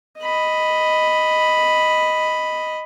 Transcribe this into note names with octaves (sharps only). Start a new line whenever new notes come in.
D#5 B5